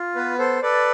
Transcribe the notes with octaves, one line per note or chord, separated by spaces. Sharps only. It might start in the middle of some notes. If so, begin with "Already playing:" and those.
Already playing: F4
B3 B4
A4 C5
A4 B4 D5